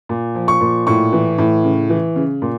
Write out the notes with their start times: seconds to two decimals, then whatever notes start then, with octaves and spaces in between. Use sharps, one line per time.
0.09 A#2
0.35 F3
0.48 C#6
0.61 A#2
0.87 A2 C#6
1.13 E3
1.38 A2
1.64 C#3
1.90 E3
2.16 C#3
2.42 A#2